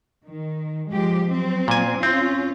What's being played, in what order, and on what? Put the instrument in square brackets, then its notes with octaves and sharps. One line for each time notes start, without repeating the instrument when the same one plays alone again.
[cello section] D#3
F3 G#3 G4
F#3 C4
[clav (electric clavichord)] A#2 G#5
[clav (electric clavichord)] C4 [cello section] C#4 F4